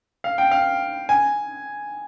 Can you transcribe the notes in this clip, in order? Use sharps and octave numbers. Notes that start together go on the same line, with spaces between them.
F5
G5
F5
G#5